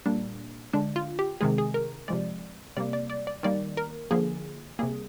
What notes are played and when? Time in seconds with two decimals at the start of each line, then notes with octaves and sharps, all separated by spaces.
0.06 A#2 G3 A#3 D4
0.73 D3 G#3 D4
0.96 F4
1.19 G4
1.41 C3 D#3 G#3 G#4
1.58 G#4
1.74 A#4
2.08 C3 F3 G#3 D5
2.77 C3 G3 A#3 D5
2.93 D5
3.10 D5
3.27 D5
3.43 D#3 G3 A#3 D5
3.77 A#4
4.11 D3 F3 A#3 G#4
4.79 C3 G3 A#3 G#4